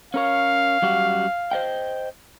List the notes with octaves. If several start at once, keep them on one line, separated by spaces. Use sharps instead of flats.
C#4 A#4 C#5 F5
F#2 G3 F#4
C5 D#5 G5